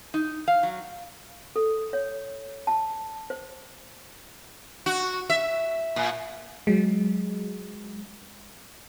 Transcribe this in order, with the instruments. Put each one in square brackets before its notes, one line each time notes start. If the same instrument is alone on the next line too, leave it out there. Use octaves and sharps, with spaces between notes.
[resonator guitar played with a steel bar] D#4
F5
F#3
[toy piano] A4
C#5
A5
C5
[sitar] F#4
E5
A#2
[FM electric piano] F#3 G#3